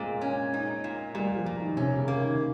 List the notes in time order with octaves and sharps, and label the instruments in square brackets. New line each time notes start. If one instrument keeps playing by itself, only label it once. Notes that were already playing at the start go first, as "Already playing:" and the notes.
Already playing: [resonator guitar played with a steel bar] A#2 [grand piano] G#3 C4
[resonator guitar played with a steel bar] C#4
D#4
A#2
[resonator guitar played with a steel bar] A#2 [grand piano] G3
[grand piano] F3
[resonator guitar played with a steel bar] A#2
[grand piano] D#3
[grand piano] C3 [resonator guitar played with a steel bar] C#4
[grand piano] C#3
[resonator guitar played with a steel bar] A#3
[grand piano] D#3